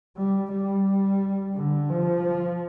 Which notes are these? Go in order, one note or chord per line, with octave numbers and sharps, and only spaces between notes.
G3
G3
D3
F3